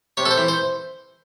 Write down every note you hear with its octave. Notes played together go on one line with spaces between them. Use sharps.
C3 C#5
A4
C5
E3
C5